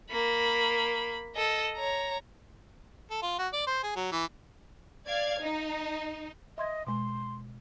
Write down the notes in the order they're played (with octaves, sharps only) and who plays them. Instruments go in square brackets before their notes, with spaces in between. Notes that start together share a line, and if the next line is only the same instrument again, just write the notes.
[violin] A#3 B5
A4 D#5
C#5 A#5
[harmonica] A4
F4
F#4
D5
C5
G#4
F#3
E3
[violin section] D5 F5 G#6
D#4
[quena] D#5 [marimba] E5 C6 G#6
[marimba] B2 G#3 [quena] C6